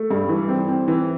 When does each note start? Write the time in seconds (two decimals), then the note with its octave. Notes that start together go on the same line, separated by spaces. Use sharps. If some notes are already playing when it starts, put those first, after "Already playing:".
Already playing: A3
0.11 G2
0.29 E3
0.49 C4
0.69 C4
0.88 E3